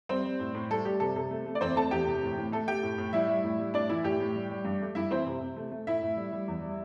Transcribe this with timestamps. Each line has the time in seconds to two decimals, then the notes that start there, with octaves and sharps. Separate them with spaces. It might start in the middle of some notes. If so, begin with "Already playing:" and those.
0.09 G3 C4 C5
0.25 G3
0.40 A2
0.55 A2
0.70 G3 A4
0.85 G3 G4
1.00 C3 A4
1.15 C3 A4
1.31 A3
1.46 A3
1.55 D5
1.61 E2 C4 C5
1.76 A3 A4 A5
1.91 E2 G4 G5
2.07 C3
2.23 A2
2.38 A2
2.52 A3 A4
2.68 A3 G4 G5
2.83 A2
2.98 A2
3.13 G3 E4 E5
3.28 G3
3.44 A2
3.58 G3
3.74 A2 D4 D5
3.89 E3 E4 E5
4.04 A2 G4 G5
4.20 A2
4.35 G3
4.51 G3
4.65 G2
4.81 A3
4.95 G2 E4 E5
5.11 E3 C4 C5
5.26 C3
5.41 C3
5.56 A3
5.72 A3
5.87 A2 E4 E5
6.02 A2
6.17 G3
6.32 G3
6.48 E2
6.62 G3